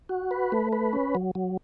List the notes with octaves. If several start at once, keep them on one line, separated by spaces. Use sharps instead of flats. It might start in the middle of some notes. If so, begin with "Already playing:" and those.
F#4
B4
A3
B4
C#4
F#3
F#3